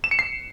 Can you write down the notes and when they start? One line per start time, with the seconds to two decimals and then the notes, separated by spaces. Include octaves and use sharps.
0.04 E7
0.11 C#7
0.19 C7